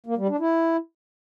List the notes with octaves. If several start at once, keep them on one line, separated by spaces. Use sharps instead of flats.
A#3
G3
D4
E4